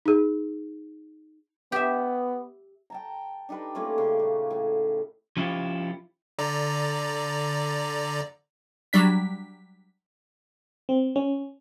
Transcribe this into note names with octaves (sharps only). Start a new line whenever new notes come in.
D#4 G#4
B3 G4 E5
G5 A5 A#5
D4 D#4 G4 B4
A3 A#3 C#4 F4
C#3
A#2
A2
F3 C#4 E4 F4 G4
D3 D5 A#5
F#3 G3 D4 B6
C4
C#4